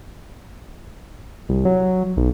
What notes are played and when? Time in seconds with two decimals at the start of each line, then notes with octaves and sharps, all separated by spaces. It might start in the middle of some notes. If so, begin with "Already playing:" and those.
1.49 C2
1.65 F#3
2.17 B1